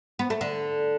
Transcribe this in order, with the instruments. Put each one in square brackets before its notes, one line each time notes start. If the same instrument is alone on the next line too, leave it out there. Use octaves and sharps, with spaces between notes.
[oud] B3
A3
D3